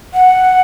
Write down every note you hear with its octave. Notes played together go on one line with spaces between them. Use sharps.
F#5